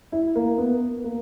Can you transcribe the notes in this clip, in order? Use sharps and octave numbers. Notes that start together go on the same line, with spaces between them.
E4
A#3
B3
A#3